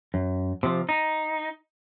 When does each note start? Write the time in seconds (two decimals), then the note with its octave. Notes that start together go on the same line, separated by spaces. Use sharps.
0.14 F#2
0.63 C3 F3
0.89 D#4